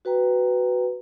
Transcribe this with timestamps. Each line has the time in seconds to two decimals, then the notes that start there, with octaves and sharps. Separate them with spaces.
0.05 F#4 B4 G5 A#5